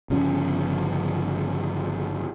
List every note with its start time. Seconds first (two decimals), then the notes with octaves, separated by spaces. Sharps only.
0.10 G1 C#3 F3 C#4